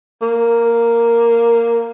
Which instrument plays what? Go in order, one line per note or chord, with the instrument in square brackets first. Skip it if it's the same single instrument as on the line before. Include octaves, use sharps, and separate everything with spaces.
[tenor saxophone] A#3